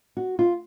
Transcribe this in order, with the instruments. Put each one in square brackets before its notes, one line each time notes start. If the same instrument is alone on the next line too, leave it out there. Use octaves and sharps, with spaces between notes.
[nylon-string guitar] F#4
F4